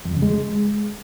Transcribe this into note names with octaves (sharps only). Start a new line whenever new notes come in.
F2
E2
C#3
G#3